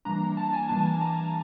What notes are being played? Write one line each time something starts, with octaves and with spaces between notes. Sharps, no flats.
E3 G3 A#3 D4 A#5
A#5
A5
G#5
E3 G3 A#3 D4 A5
A#5